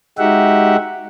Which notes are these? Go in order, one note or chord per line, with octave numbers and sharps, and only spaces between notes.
G#3 D#4 F#4 G4 E5 F#5